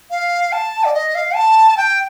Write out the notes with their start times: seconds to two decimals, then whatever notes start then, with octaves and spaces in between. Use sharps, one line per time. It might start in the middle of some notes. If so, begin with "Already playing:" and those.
0.11 F5
0.52 A5
0.84 D5
0.94 D#5
1.15 F5
1.35 A5
1.77 G5